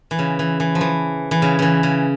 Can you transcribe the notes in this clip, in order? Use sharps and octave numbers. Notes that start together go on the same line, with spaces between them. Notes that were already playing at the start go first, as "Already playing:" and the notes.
E3
C#3
E3
E3
F3
E3
E3
C#3
C#3 E3
C#3